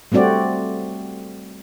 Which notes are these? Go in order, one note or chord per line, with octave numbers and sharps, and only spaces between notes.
G3 A3 C4 F#4 D5